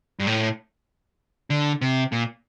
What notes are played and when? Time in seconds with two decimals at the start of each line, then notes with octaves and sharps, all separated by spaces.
0.19 G2
0.27 A2
1.50 D3
1.81 C3
2.12 A#2